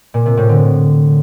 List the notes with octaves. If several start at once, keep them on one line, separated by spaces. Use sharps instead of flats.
A#2
C3
A2
D3